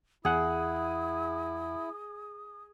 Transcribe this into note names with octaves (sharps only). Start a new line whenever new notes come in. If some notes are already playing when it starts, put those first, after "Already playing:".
E2 E4 G#4 F#5 D#6 F#6